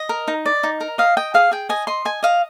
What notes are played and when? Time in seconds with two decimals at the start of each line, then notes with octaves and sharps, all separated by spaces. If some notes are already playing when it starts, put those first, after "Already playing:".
Already playing: D#5
0.09 A#4
0.28 D#4
0.46 D5
0.63 D#4
0.81 A#4
0.98 D#5 F5
1.17 D#5 G5
1.34 G#4 F5
1.51 G#4 G5
1.69 D#5 G#5
1.87 D#5 C6
2.05 D#5 G#5
2.23 D#5 F5